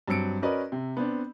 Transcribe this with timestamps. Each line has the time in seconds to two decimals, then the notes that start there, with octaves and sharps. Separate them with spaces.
0.08 G2 F#3 C4 E6 C#7 D7
0.42 C#4 F#4 A#4 B4 D5 D#5
0.72 C3
0.97 B3 C4 D4